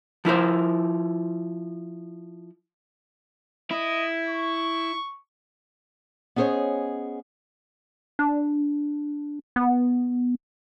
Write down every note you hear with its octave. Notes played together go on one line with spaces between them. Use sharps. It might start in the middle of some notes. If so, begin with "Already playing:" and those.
F3 E4 A#4 C5
E4 D#5
C#6
B3 C#4 G#4 C5 C#5 D#5
D4
B3